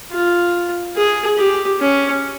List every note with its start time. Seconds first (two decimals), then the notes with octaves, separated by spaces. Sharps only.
0.12 F4
0.96 G#4
1.38 G4
1.80 C#4